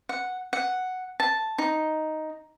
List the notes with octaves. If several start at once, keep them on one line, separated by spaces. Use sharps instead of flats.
F#5
F#5
A5
D#4